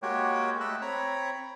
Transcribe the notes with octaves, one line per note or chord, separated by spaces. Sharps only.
G#3 A#3 F#4 G4 C#5 G5
A3 A4 D#5 B5 E6 F#6
C4 C#5 A#5 B5